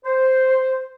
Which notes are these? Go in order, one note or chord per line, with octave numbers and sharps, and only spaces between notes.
C5